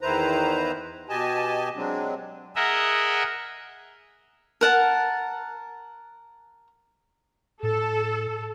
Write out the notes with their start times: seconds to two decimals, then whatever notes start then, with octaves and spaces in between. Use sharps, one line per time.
0.01 E2 D#3 E4 B4 C5 A#5
1.09 B2 G4 D#5 G#5 A5
1.76 F#3 G#3 C4 D4
2.56 G#4 A#4 D#5 E5 F#5
4.61 A#4 F#5 A5
7.63 A2 A4